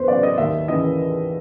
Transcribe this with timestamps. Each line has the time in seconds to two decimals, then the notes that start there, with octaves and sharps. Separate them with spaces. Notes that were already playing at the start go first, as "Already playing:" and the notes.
Already playing: E2 B4 C5
0.08 C#3 F#3 D5
0.23 D#5
0.38 D#2 E5
0.68 C#3 E3 D#5